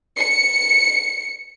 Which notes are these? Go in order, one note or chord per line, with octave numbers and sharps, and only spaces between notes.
C#7